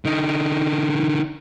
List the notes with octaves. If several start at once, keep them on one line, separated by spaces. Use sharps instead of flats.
D3 D#4